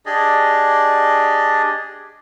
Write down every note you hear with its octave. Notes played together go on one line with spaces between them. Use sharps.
D4 G4 G#4 D5 D#5